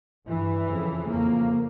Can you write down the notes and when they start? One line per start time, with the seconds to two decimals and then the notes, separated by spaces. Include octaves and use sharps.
0.28 G2 E3
0.68 F2 C#3
1.07 F2 C#3 A#3